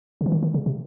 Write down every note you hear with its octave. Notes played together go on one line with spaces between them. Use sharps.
C#3
E3
D#3
D#3
C#3
C3